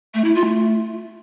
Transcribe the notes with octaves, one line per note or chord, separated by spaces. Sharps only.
A3
E4
F4
A3